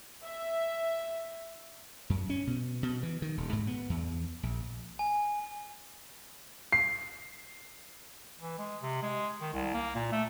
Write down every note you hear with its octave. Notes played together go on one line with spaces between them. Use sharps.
E5
F#2
C#4
B2
B2
E3
D#3
D#1
G#2
B3
E2
A#1
G#5
C7
E3
G#3
C3
G#3
D#3
C2
A#3
A#2
A3